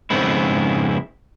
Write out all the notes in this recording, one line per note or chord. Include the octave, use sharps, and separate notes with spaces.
F2 G#2 C#3 B3 C4 E4